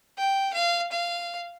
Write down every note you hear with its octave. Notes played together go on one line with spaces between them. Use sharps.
G5
F5
F5